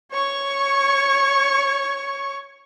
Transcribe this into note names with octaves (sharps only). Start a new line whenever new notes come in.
C#5 C#6